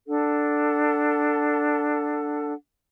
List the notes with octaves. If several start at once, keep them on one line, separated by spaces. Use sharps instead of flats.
D4 A4 F#5